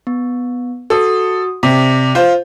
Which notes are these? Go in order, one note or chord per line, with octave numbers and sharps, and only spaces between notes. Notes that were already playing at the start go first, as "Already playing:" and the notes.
B3
F#4 A4 D#6
C3 D5 D6 B6
F4 C5